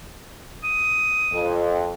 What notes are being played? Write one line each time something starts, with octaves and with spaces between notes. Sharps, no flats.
D#6
F2